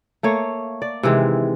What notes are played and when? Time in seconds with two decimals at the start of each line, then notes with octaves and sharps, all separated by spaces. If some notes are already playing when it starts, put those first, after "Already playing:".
0.23 A3 A#3 C#5
0.82 D5
1.03 C3 D#3 E3 G#3